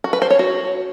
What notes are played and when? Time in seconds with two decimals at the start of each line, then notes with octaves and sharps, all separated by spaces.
0.04 F#4
0.13 B4
0.22 C5
0.30 C#5
0.39 F#4